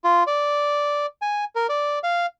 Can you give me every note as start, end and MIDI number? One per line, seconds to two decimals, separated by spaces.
0.04 0.23 65
0.27 1.06 74
1.22 1.44 80
1.55 1.67 70
1.69 1.99 74
2.04 2.26 77